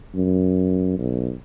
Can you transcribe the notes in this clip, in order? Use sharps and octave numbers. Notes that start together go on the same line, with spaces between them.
F#2
B1